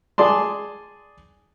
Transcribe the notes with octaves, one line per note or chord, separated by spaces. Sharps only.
G#4 D5 A5 C6